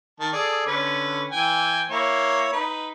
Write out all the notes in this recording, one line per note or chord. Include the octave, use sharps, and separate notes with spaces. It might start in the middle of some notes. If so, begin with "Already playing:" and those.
D#3 A5
G#4 A4 D5
D3 C#4 B4
E3 G5 G#5
A#3 E4 C#5
D#4 B4